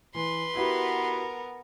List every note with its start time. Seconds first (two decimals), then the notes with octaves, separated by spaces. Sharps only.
0.15 E3 B4 C6
0.55 B3 E4 F#4 G4 A#4